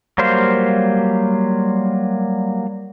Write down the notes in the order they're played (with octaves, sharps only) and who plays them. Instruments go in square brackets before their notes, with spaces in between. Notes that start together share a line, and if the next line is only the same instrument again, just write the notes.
[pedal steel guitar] F#3 G3 A#3 C5 F5